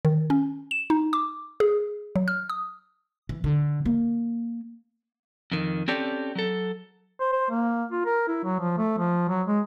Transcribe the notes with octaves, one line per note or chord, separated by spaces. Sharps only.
D#3
C#4
E7
D#4
D6
G#4
F#3
F6
D#6
E3
D3
A#3
F2 D#3
C4 C#4 G4 A4 D5
F#3 A4
C5
C5
A#3
F4
A#4
E4
F#3
F3
A3
F3
F#3
G#3